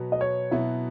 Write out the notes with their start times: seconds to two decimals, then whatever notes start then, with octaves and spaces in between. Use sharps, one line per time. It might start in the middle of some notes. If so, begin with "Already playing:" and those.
Already playing: B2 F#3 B3
0.12 D#5
0.21 C#5
0.51 B2 F#3 B3 E4